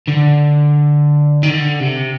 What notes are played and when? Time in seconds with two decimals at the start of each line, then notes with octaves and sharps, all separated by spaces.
0.08 D3
1.43 D#3
1.50 D3
1.80 C3